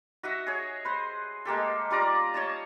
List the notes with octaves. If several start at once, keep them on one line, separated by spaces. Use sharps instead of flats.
F#4 D#5 E5 F#5
G#4 C#5
B4 C5
G#3 A#3 G4 A4
G3 F4 D5 A#5
C#5 D#5 A5